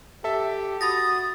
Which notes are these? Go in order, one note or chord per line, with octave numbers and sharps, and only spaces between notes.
G4 A4 E5 A5
F#4 B5 D#6 A6 A#6